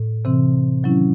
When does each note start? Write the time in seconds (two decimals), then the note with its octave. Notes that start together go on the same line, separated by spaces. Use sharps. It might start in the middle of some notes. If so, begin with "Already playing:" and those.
Already playing: A2
0.25 C3 E3 C4
0.83 D#3 F#3 C#4 E4